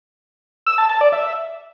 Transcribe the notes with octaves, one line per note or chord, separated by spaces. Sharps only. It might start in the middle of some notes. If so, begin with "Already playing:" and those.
E6
A5
A5
D5
E5